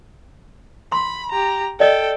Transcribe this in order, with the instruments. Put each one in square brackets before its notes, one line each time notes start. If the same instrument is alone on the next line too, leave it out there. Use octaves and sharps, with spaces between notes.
[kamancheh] B5 [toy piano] C6
[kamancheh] G4 A#5
[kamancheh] A4 G5 [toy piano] D5 D#5